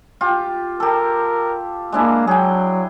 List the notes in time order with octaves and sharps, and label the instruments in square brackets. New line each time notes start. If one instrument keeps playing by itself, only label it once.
[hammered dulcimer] F4 G4
[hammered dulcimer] G4 A4 [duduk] A#4
[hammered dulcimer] G#3 D4 E4 [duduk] A#3
[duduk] F#3 [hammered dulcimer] G#4 G5